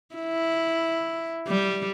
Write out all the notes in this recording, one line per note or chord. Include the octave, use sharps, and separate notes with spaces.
E4
G3